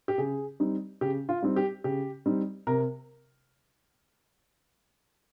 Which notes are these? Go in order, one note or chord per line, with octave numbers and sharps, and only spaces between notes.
G4
C#3 G#4
G3 C4 D#4
C#3 G4
F4
G3 C4 D#4
G4
C#3 G4
G3 C4 D#4
C3 A#4